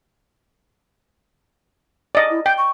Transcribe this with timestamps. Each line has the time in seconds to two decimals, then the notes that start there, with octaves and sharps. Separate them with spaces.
2.15 D5 D#5
2.31 E4
2.46 G5 G6
2.58 C#6